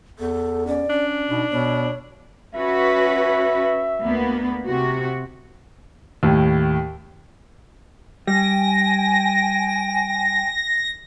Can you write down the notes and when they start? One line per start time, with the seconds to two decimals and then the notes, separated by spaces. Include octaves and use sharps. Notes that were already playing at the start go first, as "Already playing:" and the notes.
0.19 E2 A4
0.67 C#4 D5
0.90 C#4 D4
1.29 B2 D#4
1.51 B2 B3 C#5
2.54 C#4 F#4 B4 E5
4.01 D2 A#3 B3
4.66 C3 F#4
6.23 D#2 A2
8.27 G3 G5 G#5 A#6